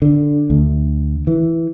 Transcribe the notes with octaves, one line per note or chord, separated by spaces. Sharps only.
D3
D2
E3